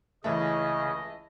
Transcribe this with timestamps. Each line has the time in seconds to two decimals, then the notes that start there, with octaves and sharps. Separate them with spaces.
0.24 C#2 C#3 E3 A3 D#5